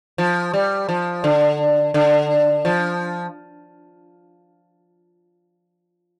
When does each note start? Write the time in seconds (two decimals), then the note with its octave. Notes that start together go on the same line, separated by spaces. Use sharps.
0.18 F3
0.53 G3
0.89 F3
1.24 D3
1.94 D3
2.65 F3